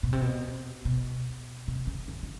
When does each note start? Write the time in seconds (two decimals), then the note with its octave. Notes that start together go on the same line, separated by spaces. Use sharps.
0.03 B2
0.13 C3
0.21 B2
0.85 B2
1.68 C3
1.87 C#3
2.08 D#3
2.23 C#3